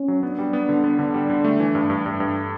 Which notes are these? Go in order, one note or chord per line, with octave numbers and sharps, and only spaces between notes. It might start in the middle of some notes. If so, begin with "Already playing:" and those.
Already playing: C#4
F#3
B3 D4
G3
B3
D3
B3
D3
G3
D3
A3
E3
G2
G2
G2
G2